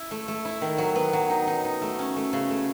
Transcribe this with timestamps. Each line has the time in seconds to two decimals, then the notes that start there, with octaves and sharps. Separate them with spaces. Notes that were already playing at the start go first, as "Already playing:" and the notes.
Already playing: E4
0.11 A3
0.28 A3
0.45 E4
0.61 D#3
0.78 F#3
0.95 B3
1.13 F#3
1.30 D#4
1.47 D#4
1.64 D#4
1.82 A3
1.99 C#4
2.16 A3
2.33 C#3
2.51 A3